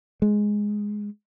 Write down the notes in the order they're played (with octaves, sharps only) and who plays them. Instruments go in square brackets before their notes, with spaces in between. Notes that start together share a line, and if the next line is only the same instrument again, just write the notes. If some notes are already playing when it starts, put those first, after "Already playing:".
[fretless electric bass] G#3